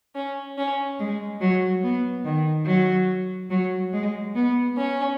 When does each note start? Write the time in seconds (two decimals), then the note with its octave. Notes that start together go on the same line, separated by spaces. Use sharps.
0.15 C#4
0.57 C#4
0.99 G#3
1.40 F#3
1.83 B3
2.25 D#3
2.66 F#3
3.50 F#3
3.92 G#3
4.35 B3
4.77 C#4